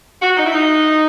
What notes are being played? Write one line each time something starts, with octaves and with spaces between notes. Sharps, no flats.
F#4
D#4
E4
D#4